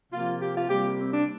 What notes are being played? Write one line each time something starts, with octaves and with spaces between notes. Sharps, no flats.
C3 F3 A#3 F4
G4
F4
C3 G3 A#3 G4
C4
D4